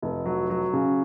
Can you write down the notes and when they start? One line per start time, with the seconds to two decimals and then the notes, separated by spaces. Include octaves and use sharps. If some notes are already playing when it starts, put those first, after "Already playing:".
0.02 F1
0.26 F#3
0.50 F#3
0.73 C#3